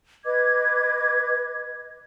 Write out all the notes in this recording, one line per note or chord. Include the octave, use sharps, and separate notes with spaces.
B4 D#5 D6 G#6